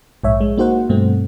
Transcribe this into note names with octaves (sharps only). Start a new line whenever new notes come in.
A#1 G#2 C#5 E5
G#3
A#3 D#4 F#4 C5 F#5
G2 B2 A3 C4